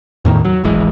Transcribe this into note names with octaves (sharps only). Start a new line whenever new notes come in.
E2 A2 D#3
F#3
D1 G#1 E3 G#3